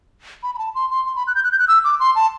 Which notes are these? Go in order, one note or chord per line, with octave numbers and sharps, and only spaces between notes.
B5
B5
A5
C6
C6
C6
B5
F#6
G6
F#6
G6
F#6
E6
D6
C6
A5